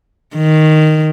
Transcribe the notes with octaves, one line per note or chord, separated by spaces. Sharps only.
D#3